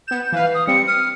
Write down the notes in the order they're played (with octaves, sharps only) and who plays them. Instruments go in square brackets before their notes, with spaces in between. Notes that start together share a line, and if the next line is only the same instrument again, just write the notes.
[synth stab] B3 E7 [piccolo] G6
[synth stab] E3 B4 [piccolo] F5
[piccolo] D#6
[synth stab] G3 C4 [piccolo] C#7
[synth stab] D#6 [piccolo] F6